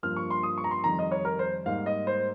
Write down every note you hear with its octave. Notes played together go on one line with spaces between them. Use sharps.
G2 F3 A#3 F6
C#6
C6
D#6
C#6
A#5
C6
F2 D#3 G3 A#5
D#5
C#5
A#4
C5
G#2 G3 A#3 F5
D#5
C5